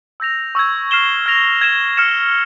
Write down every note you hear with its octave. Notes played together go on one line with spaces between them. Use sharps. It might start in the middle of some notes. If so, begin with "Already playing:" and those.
E6 G6 A#6 F7
C#6 E6 G#6
F6 C7 E7 G7
F6 A#6 F7
G#6 E7 G7
F6 G#6 C#7 E7